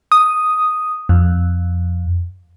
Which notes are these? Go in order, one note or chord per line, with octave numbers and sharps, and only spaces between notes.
D#6
F2